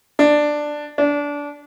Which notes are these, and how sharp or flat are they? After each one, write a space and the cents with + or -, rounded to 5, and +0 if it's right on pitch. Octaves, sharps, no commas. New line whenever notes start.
D4 +10
D4 -20